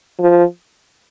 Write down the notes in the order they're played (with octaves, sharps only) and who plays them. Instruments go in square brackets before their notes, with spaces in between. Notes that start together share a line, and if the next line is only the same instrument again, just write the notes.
[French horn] F3